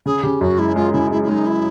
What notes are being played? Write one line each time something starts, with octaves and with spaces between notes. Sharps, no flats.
C#3 G#4
C#3 G4
F#2 F#4
G#3 E4
G#3 F4
C#3 E4
G#3 E4
E4
G#3 D#4
E4